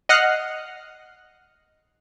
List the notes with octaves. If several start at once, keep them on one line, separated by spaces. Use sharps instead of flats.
D#5 F#5 F6 F#6 C7